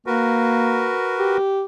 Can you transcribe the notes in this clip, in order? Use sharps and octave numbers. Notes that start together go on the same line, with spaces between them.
A#3 F#4 A#4 B4
G4